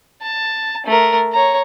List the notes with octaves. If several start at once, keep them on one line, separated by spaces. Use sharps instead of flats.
A5
A3 A#4
C#5 A#5